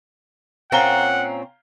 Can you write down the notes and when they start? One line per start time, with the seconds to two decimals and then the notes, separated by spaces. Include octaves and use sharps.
0.72 A#2 C4 C#4 F5 F#5 A#5 G7